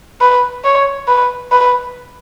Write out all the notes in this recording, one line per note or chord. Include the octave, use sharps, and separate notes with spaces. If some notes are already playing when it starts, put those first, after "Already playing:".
B4
C#5
B4
B4